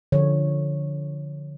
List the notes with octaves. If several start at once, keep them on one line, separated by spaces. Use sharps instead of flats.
D3 F3 C#5